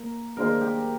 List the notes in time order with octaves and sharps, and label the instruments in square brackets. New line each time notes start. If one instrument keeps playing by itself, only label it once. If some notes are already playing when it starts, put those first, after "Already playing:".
Already playing: [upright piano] A#3 [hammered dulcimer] A#4
[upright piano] A#3 D4 G#4 C5 D#5 [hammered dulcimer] A#4
[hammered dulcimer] G4